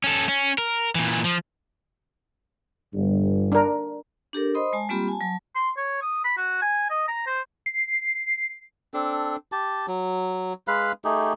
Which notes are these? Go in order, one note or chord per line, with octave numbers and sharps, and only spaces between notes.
C#4 A4
C#4
A#4
A#2 E3
F3
G1 G2
D4 A#4
D4 G4 A4 A#4
C5 D#5 B5 C6 D#6
G#3 G#5 A5
G3 A#3 C4 F4 G4 B5
G#5 A5
F#3 A5
C6
C#5
D#6
B5
F#4
G#5
D#5
A#5
C5
C7
C4 D4 A4
G4 A5
F#3
G#3 B4 F5 B5
A3 D#4 G4 G#4